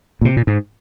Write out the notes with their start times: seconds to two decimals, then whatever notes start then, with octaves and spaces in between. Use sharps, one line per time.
0.21 A#2
0.25 C3
0.37 A#2
0.47 G#2